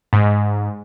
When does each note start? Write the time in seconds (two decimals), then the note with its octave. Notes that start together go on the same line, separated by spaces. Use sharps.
0.13 G#2